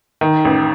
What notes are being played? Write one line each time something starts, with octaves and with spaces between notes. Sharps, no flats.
D#3
A1